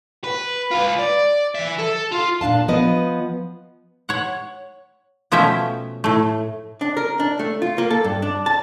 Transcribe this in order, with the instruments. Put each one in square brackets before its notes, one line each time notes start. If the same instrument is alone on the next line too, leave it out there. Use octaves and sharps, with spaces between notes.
[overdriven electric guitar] B4
F4 B4
D5
E3 E5
A4
F4
[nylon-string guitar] A#2 D4 F5 A5
F3 B3 B4 D#5
[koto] C#5 F#5
B2 F3 A3 C#4 E5 G5
A2 A3
[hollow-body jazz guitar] D4
A#4
D4
A3
F4
A#3
A4
G2
D4
A5